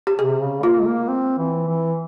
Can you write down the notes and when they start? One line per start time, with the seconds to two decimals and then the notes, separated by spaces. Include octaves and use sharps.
0.07 G4
0.19 C3 G#4
0.41 C#3
0.63 A#3 F4
0.79 G#3
0.86 A#3
1.08 C4
1.38 E3
1.68 E3